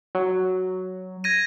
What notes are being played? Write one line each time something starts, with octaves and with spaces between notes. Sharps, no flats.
F#3
G#6 A#6 D#7